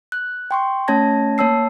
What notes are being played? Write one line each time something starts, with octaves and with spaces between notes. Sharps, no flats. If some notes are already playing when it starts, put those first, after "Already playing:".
F#6
G5 C6 C#6
A3 C#4 C#5 A5 G#6 A#6
A#3 C#5 A5 E6 C7